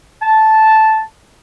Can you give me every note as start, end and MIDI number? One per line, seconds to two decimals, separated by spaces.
0.22 1.01 81